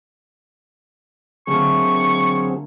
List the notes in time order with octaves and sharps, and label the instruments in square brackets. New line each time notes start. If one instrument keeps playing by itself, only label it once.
[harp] D3 A3 A#3 [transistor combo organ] F#3 C4 G#4 [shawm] C#6